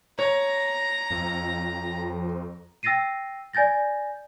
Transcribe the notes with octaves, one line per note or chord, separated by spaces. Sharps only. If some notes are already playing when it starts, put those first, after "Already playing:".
C#5 A#5
F2
G5 E6 A6 A#6 C7 D#7
D5 G#5 G6 A6 A#6